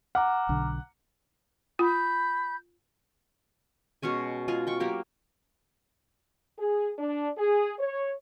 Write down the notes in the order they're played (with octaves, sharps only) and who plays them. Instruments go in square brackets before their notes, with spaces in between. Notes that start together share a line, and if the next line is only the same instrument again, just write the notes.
[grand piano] F#5 [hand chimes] A#5 D6 F6
[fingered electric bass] B1 D3
[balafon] F4 [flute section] B5 G6
[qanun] B2 G#3 C#4 G#5
G#3 F4 G#4
G5 C#6
F#3 A#3 G4 A#4
[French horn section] G#4
D4
G#4
C#5